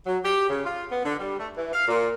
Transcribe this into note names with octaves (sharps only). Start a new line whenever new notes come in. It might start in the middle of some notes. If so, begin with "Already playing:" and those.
F#3
G4
C#3
F4
B3
D3
G3
A3
E3
F5
A#2